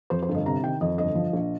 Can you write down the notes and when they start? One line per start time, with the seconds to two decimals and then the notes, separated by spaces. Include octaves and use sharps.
0.10 F2 C5
0.23 C5
0.29 G1
0.34 D#5
0.46 C3 A#5
0.63 D#3 G5
0.81 F2 D#5
0.98 G1 D#5
1.15 F3
1.33 A#1